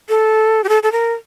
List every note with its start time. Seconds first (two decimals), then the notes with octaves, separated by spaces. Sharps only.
0.09 A4
0.64 G4
0.69 A4
0.83 A4
0.92 A#4